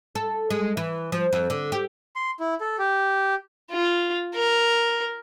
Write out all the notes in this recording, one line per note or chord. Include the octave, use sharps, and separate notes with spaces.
A4
G#3
E3
F3
F2
D3
G4
C6
E4
A4
G4
F4
A#4